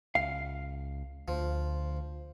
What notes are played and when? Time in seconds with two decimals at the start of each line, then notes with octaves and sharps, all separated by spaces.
0.15 C#2 F5
1.28 D2 F3